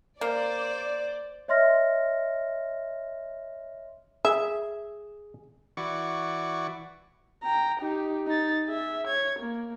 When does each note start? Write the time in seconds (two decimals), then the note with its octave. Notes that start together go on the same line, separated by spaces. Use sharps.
0.21 A#3 C5 D5
1.48 C#5 D#5 E5 C6 F6 A#6
4.25 G#4 E5
5.77 E3 F#4 D5 C#6
7.44 G5 A#5
7.80 D#4 G4
8.27 D#4 A6
8.66 G#4 E5
9.07 C#5 G#6
9.39 A#3